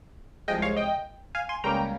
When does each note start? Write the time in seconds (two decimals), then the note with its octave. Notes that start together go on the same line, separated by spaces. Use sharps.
0.48 C2 C3 F3 G#3 D#5 G5
0.62 C#5 F5
0.77 D#5 G5
1.35 F5 G#5
1.49 G#5 C6
1.64 C#2 C#3 G3 A#3 C#4 G5 A#5